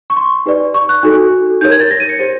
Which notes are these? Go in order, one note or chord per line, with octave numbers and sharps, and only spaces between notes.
C#6
C6
D#4 G4 B4 D5
C#6
F#6
D#4 F#4 A4
D#4 G4 A#4 C#5 G6
G#6
A6
A#6
D#7
C#7
G4 C5